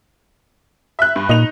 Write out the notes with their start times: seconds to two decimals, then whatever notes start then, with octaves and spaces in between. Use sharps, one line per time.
0.99 E5 F#6
1.16 G2
1.29 A#2 D#4 F7